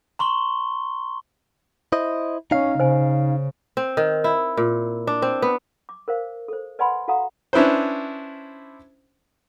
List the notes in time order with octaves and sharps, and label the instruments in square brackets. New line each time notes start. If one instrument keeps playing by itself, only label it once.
[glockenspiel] A#5 C6 C#6 G7
[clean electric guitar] E4 C5 D#5
[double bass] C#4 [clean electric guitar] D#4 F5
[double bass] C#3 [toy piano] C5 G#5
[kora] C4
D#3
E4
A#2
D4
C4
B3
[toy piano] D6
A#4 C5 F5
A4 C5
B4 D5 F#5 G#5 B5 C6
F#4 A4 F5 F#5 A#5 D#6
[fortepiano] C#4 D4 E4 B4 C5